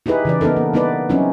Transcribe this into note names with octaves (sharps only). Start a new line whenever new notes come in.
D#4 E4 G4 G#4 B4
C#3 E3 D5
B3 D4 D#4 A4 A#4
A#3
G3 B3 D#4 E4 B4 D5
F#3 G3 C4 C#4 D#4 E4